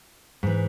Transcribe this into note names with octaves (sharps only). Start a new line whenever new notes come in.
G#2 E3